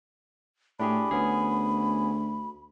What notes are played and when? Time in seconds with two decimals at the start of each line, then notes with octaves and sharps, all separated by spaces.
0.79 A2 D4 G4 G#4 B5
1.11 D2 B3 C#4 G#4